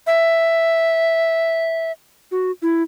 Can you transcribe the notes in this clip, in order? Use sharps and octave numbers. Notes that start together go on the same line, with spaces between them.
E5
F#4
E4